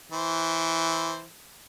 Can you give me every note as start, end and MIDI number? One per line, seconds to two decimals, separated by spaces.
0.12 1.25 52
0.12 1.25 72